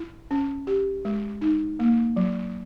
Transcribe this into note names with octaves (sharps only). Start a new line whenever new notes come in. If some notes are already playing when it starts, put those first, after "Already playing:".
Already playing: E4
C#4
G4
G#3
D#4
A#3
F#3